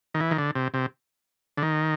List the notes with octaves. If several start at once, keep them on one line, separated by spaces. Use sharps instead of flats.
D#3
E3
D#3
D3
C3
C3
D3
D#3